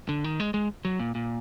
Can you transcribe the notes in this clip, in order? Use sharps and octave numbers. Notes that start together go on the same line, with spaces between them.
D3
D#3
G#3
G#3
F#3
A#2
A#2